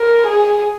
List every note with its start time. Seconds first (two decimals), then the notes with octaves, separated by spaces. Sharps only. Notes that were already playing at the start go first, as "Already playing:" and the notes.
Already playing: A#4
0.27 G#4